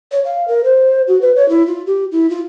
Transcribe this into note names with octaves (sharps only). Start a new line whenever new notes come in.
C#5
F5
A#4
C5
F#4
B4
C#5
E4
F4
G4
E4
F4